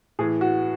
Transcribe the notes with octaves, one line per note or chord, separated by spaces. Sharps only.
A2 E3 G#4
F#4